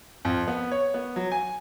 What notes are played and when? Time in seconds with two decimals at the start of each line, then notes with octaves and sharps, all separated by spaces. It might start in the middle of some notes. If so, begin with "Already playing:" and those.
0.25 F2
0.48 B3
0.72 C#5
0.94 B3
1.16 F#3
1.32 G#5